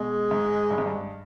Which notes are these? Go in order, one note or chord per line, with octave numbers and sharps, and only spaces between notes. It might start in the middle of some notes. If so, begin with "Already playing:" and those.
Already playing: B2 G#3
G#2
G2
G#2
G2